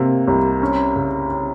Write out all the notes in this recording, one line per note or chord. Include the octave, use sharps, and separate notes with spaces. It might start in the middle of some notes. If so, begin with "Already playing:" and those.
Already playing: C3 A#3
C2
C#4
C#3
C#4